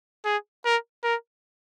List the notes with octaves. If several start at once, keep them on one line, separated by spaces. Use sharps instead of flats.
G#4
A#4
A#4